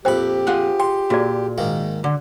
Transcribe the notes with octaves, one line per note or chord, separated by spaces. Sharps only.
A#1 F2 G4 C5 G5 B5
F4 G#4 F#5
G5 C6
A#2 F#4 G#4 D5
G#2 D#3 A#3
D3